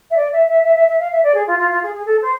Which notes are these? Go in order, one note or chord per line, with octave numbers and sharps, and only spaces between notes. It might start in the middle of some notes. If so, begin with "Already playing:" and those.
E5
D5
E5
E5
E5
E5
E5
F5
E5
D5
G#4
F4
F4
F4
G#4
G#4
A4
C5